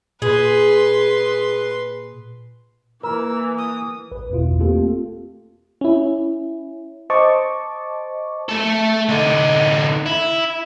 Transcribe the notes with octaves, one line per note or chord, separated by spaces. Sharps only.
A#2 G#4 B4 C6
E3 A#3 A#4 E6
D#6
A1 B4
G1 E2 B2 E4 F4
A3 A#3 C4 F4 G4 A4
C#4 E4
C5 D#5 A5 C#6 D6
A3 A4
D3 D#4
E4